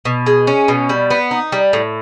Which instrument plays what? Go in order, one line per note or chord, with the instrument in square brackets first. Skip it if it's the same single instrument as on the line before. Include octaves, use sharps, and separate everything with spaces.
[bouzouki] B2
G#3
C#4
B2
G3
B3
D#4
G3
A2